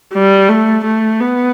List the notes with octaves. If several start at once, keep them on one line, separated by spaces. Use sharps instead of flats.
G3
A3
A3
B3